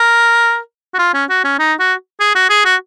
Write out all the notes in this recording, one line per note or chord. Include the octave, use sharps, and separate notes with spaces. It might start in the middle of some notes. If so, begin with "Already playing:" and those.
Already playing: A#4
F#4
F4
C#4
F#4
C#4
D#4
F#4
G#4
F#4
G#4
F#4